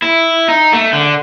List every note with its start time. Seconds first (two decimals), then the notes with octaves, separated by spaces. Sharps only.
0.02 E4
0.48 D#4
0.73 A3
0.93 D3